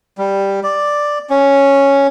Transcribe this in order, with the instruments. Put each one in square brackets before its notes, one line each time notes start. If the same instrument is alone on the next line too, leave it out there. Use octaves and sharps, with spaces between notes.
[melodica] G3
D5
C#4